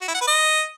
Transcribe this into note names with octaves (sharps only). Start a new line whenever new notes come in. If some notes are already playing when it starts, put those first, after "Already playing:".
F#4
E4
F#5
B4
D#5